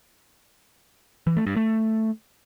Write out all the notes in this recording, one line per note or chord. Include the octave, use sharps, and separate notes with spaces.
E3
A3
G2
A3